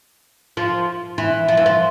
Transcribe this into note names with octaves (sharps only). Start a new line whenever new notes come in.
F3
E3
F3
E3
F3